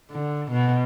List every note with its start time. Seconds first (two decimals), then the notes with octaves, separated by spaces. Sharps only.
0.11 D3
0.52 B2